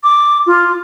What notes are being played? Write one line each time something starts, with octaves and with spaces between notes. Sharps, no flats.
D6
F4